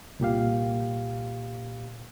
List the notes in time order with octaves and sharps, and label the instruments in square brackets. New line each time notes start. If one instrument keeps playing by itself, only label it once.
[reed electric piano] C2 A#2 G4 F5